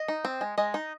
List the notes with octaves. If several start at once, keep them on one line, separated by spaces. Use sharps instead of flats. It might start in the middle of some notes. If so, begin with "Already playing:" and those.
Already playing: D#5
D#4
C4
G#3
G#3 D#5
D#4